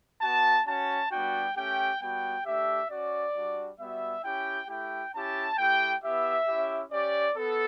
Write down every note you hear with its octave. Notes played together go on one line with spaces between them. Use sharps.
B3 F#4 A5
C#4 F#4 A5
G3 B3 D4 F#4 G5
A3 C#4 G4 G5
G3 B3 F#4 G5
A3 D4 G4 E5
C#4 F#4 D5
G3 D4 F#4
G3 B3 F#4 E5
C#4 E4 G4 G5
A3 E4 G4 G5
C#4 E4 G4 A5
A3 E4 G4 G5
B3 E4 G4 E5
C#4 E4 G4
C#4 G4 D5
B3 A4